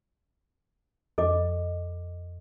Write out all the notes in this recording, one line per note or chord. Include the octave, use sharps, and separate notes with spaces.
F2 A4 D#5 D6